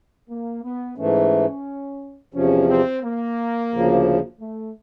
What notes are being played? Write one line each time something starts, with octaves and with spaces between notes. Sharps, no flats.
A#3
B3
G#2 E3 A3 C#4
E2 C3 F3 C#4
C4
A#3
D2 C#3 F3
A3